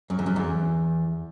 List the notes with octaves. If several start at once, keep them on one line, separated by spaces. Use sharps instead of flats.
F#2
E2
F#2
E2